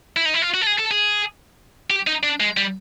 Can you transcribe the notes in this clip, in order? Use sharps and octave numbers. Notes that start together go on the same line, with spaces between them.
E4
D#4
E4
F4
F#4
A4
G#4
A4
G#4
G4
D#4
D4
G#3
G3